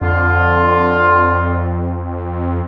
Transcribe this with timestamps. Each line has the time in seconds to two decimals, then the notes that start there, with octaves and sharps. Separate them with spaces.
0.01 F2 D3 F4